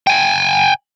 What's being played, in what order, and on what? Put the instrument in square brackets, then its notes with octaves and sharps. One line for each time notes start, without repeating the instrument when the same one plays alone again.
[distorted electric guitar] G5 G#5